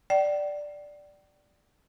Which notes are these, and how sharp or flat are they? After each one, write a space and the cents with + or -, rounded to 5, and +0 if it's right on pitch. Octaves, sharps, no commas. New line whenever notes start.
D5 +0 G5 -40